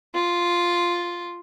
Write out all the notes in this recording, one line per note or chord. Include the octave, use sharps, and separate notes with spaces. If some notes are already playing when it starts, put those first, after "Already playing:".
F4